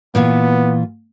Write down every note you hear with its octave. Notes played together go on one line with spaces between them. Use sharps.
A#2 E3 B3 F4